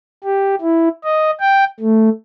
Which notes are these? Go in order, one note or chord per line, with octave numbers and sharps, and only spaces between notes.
G4
E4
D#5
G5
A3